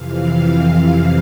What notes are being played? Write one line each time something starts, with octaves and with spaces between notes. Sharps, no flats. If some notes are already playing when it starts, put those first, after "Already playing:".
Already playing: F2 C3 E3 F5
F5